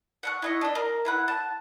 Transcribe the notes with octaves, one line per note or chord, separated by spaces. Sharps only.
F#5 C#6 F#6
E4 D#5 C#6
D4 D#5
A#4
E4 B4 F#5
A5